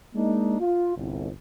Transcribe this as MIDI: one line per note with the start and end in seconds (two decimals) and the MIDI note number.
0.15 0.58 56
0.15 0.58 58
0.15 0.58 62
0.15 0.58 63
0.60 0.93 65
0.96 1.29 31
0.96 1.29 36